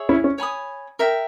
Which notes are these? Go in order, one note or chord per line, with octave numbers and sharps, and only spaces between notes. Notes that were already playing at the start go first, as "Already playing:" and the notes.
Already playing: G#4 C#5 E5
C#4 E4
C#4
C#5 G#5 B5 D#6
A#4 E5 G5